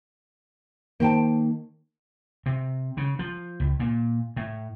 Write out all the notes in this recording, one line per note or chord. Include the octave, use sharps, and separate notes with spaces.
D#3 A#3 C5 G5 A5
C3
C#3
F3
C#2
A#2
A2